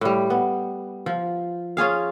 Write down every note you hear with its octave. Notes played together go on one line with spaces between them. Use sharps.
A2 G3
B3
F3
C#4 F4 G#4 F5